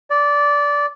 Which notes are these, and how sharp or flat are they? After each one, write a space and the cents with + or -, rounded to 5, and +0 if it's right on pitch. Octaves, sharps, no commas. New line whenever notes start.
D5 -15